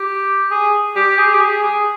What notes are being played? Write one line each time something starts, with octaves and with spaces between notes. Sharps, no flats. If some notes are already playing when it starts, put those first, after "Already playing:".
Already playing: G4
G#4
G4
G#4
G4
G#4
G#4